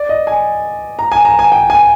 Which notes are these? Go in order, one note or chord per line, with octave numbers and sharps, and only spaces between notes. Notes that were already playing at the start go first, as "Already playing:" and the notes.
Already playing: D5
D#5
G#5
A#5
G#5
A#5
G#5
G5
G#5